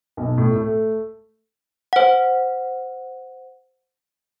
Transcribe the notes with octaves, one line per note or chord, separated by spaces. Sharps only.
B1
A2
A3
C5 F#5